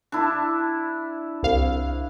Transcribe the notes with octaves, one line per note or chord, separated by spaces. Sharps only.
D4 E4
C2 F5